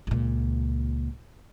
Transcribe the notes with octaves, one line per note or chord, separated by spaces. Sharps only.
C#2 A#2